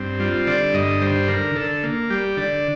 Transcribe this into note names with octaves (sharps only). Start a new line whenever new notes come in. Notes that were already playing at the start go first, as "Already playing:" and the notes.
Already playing: G2 C4
G3 F4
D3 D5
G2 D#5
G3 C5
D3 A#4
D3 A4
A#3
G3 G4
D3 D5